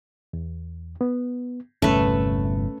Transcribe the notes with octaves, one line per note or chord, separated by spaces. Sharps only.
E2
B3
G1 E2 C3 A3 C#4 B4